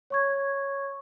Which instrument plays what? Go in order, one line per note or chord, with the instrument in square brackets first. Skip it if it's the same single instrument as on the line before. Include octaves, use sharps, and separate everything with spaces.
[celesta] C#5 C#6 G#6